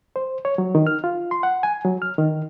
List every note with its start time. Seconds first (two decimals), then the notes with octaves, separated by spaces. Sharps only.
0.16 C5
0.45 C#5
0.58 F#3
0.75 D#3
0.87 F6
1.04 F4
1.31 C6
1.43 F#5
1.63 G#5
1.84 F#3
2.02 F6
2.18 D#3